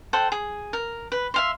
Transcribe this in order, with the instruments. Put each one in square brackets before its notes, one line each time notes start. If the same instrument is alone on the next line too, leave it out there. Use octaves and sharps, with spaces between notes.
[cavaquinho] A4 C5 F#5 G5
G#4
A#4
B4
E5 F5 C6